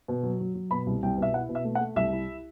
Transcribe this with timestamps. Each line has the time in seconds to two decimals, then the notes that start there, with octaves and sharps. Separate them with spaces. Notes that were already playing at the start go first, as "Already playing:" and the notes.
0.08 B2
0.23 F#3
0.40 F#3
0.55 F#3
0.71 B2 B5
0.87 C2
1.03 C2 G5
1.17 B2 E5
1.34 E4 F#5
1.49 B2
1.55 E5
1.65 A3
1.75 F#5
1.81 A3
1.96 C2 E5
2.13 E4